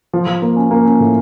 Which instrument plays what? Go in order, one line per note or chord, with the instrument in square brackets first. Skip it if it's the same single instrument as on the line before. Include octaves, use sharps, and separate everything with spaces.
[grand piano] F3
F3
A#3
C#4
A#3
C#4
A2